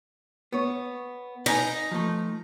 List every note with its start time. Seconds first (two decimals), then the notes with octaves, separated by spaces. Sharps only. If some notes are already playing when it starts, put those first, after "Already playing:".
0.52 B3 C#5
1.46 D#4 B4 F#5 G#5
1.91 F3 A3